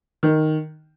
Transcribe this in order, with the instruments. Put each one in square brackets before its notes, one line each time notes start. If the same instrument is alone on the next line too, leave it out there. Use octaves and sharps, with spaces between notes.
[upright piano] D#3